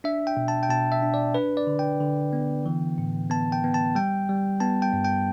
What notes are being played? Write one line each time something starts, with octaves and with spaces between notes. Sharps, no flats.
D4 E5
G5
B2
A5
G5
B2 A5
E5
D4
D5
D4 B4
D5
D3
G5
D3
B3
E3
A2
B3 A5
G5
B3
A5
G3 G5
G3
B3 A5
G5
G2
G5